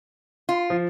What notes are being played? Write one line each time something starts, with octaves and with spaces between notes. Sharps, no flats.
F4
F3